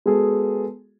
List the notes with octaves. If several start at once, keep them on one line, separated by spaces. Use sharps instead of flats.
G#3 B3 F#4 G#4 A4